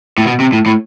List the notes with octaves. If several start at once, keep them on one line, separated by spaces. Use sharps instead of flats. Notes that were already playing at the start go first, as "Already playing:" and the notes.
A2
B2
C3
A2
A2